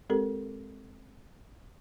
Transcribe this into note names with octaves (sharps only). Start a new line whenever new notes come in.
G#3 C4 G4 A4 A#4